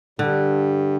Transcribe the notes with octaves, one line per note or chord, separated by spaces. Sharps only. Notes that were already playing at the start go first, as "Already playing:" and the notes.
G2 D3